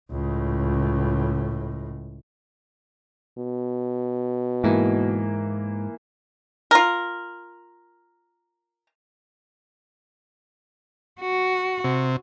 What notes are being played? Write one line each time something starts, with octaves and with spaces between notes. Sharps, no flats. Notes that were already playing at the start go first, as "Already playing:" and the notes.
C#2 A2
B2
G#2 E3 A#3
F4 A#4
F#4
C3